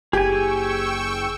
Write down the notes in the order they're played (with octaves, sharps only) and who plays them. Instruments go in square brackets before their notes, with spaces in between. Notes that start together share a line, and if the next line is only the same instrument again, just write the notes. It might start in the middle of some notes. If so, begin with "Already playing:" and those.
[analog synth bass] F#1 [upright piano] G4 [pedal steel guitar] G#4 G#5 [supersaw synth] G5 C#6 E6